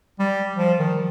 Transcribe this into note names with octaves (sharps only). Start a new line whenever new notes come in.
G3
F3
D#3